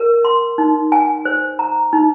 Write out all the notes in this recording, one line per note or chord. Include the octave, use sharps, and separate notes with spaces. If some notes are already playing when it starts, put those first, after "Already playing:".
Already playing: A#4
C6
D#4
G#5
C5
A#5
D#4